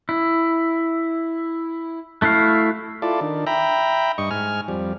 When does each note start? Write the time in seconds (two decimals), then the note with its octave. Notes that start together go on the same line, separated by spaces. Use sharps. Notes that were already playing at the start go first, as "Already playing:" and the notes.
0.09 E4
2.22 A3 E4 F#4 F5
3.02 E4 F4 A4 D5
3.21 D#3 D4
3.47 E5 G5 A#5 B5
4.18 G2 D#5 C#6
4.31 G#2 G#5 F6
4.68 F2 G3